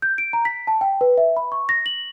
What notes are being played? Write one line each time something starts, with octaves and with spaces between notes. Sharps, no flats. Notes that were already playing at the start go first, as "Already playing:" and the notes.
G6
D7
A#5
B6
A5
G5
B4
E5
B5
C#6
A#6
F#7